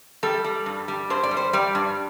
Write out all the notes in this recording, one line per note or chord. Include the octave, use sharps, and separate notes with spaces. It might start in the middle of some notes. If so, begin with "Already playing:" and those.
G3 A4
G3
G2
G3
G2 C5
D5
G3
C5
G3 D5
G2